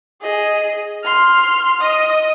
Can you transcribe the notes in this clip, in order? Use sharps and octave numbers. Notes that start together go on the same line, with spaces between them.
G#4 D#5
C6 F6
D#5 D#6